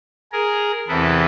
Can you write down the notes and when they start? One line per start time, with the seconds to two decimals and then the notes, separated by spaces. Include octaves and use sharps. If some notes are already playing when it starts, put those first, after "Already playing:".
0.32 G#4 A#4
0.88 E2 C3 E3 A4 B4